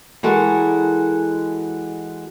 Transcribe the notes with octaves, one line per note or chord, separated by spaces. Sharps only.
E3 G#3 F#4 A4 A#4